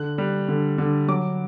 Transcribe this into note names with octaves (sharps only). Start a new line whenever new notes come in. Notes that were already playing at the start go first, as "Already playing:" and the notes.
Already playing: D3 F#6
G3
D3
D3
F#3 D6